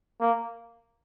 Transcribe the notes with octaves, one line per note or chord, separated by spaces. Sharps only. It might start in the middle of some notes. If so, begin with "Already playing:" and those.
A#3